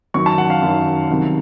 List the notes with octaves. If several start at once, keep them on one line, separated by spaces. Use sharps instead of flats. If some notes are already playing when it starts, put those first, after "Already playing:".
F#2 D#3 F#3 C#6
A5
F#5
F5
F#2 D#3 F#3
C2 C3 D#3 F#3